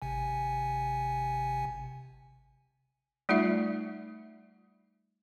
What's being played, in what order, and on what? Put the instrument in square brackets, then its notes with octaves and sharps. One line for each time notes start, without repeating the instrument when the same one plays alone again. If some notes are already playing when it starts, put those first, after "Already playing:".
[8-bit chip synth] G#1 C3 G#5
[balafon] G3 A3 D#4 F4 E5